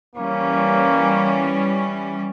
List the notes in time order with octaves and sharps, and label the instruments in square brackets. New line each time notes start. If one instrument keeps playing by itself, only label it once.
[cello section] E3 G3 C#4 [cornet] A#3